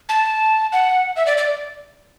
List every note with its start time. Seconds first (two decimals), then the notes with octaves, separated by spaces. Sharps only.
0.09 A5
0.73 F#5
1.16 E5
1.26 D5
1.38 D5